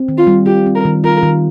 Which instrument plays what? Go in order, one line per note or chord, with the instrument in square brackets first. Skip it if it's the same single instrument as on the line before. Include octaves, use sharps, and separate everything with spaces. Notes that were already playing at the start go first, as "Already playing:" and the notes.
Already playing: [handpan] C4
D#3
[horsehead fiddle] F4
[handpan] G3
[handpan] F4 [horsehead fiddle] G4
[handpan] C4
[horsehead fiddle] A#4
[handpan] D#3
[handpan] F4 [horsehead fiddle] A#4
[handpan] D#3